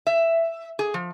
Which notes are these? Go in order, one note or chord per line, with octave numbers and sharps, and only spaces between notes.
E5
G#4
F3